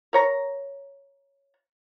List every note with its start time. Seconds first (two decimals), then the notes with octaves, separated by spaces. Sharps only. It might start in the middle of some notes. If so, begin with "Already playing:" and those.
0.13 A#4 C#5 A#5